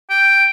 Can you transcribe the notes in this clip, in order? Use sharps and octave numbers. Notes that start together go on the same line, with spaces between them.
G5